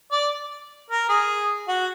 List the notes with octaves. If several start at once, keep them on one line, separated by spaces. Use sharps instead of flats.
D5
A#4
G#4
F#4